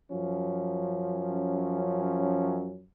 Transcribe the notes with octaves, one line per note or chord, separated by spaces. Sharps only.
F#2 F3 C#4